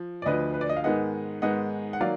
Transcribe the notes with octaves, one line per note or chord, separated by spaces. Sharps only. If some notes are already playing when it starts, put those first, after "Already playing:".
Already playing: F3
D5
D2 D3 F3 B4 D#5
B4
D5
D#5
F5
G#2 D#3 G#3 B3 D#5 F#5
G#2 D#3 G#3 B3 D#5 F#5
F#5
D#3 F#3 A#3 D5 F5